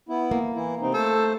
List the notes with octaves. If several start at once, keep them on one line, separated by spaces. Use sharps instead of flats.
B3 E4
A#3
E3 E4
C3 C4 D#4
A3 A4 C5